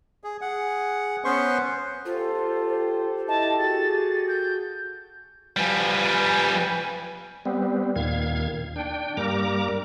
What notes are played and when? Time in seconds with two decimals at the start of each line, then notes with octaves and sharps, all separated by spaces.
0.24 G#4
0.41 G#4 F#5
1.25 B3 C#4 B4 C5 C6 C#6
2.05 F4 G4 A4 C5
2.67 C5
3.28 E4 D#5 A5
3.59 F#4 G#4 A6
4.28 G6
5.57 F3 G3 B4 G#5
7.45 G3 B3 C4
7.96 D#2 A#2 D#3 F5 G#6
8.76 D4 G5
9.17 G2 G3 A#3 A#4 A#5 D6